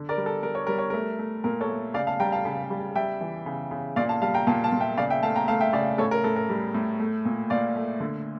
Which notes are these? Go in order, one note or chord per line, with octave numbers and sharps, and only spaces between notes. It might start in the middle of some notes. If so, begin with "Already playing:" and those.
Already playing: D3
A#4 D5
G3
A4
G3 A#4
C#5
G3 A#4
C#5
A3 A#4
A3
A#2 A#4
A4 C#5
A3
C#3 D5 F5
F5 A5
G3 G5 A#5
F5 A5
C#3
G3
G3 E5 G5
E3
C#3
C#3
A#2 D5 F5
F5 A5
G3 F5 A5
G5 A#5
A#2 F5 A5
F5 A5
A#2
E5 G5
C#3 D5 F5
E5 G5
A3 F5 A5
G5 A#5
A3 F5 A5
E5 G5
C#3 D5 F5
A2 A4 C#5
A#4
A2 A4
A#4
G3
A2
A3
A#2
A#2 D5 F5
A3
D3